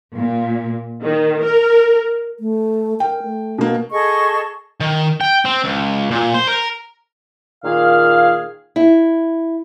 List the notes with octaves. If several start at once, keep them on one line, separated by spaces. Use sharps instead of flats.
A#2
D#3
A#4
A3
A#4 G5
A3
B2 A#3
G#4 A4 D#5 C#6
D#3
G5
C4
C#2
A#2
C5
A#4
A#2 D#3 G#4 F5
E4